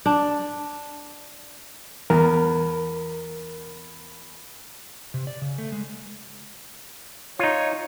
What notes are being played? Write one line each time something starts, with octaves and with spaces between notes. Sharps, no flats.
D4
E2 A#4
C3
D5
C#3
A3
G#3
D#4 F4 C#5